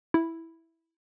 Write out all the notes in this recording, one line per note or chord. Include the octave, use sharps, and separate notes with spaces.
E4